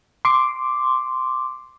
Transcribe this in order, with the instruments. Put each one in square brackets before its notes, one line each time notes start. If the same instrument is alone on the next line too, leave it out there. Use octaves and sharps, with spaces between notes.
[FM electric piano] C6 D6